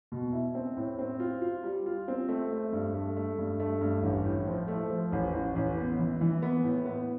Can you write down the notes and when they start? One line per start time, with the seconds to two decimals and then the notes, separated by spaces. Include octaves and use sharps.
0.12 B2
0.33 E4
0.55 C4
0.77 A2
0.98 C4
1.20 F4
1.42 F4
1.63 G3
1.86 F4
2.08 C4
2.28 A3
2.51 A3
2.72 G2
2.94 A3
3.17 A3
3.38 G2
3.60 A3
3.81 G2
4.03 A1
4.24 A2
4.47 F3
4.68 A3
4.90 F3
5.12 A1
5.34 A1
5.56 A1
5.77 B3
5.99 E3
6.21 E3
6.42 B3
6.64 A2
6.86 B3